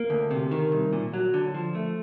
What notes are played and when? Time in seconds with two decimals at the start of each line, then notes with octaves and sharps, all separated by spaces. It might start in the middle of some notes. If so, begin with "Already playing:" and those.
Already playing: A#3
0.10 D2
0.31 C3
0.51 D#3
0.72 C2
0.93 A#2
1.14 F#3
1.34 D3
1.54 F3
1.75 A3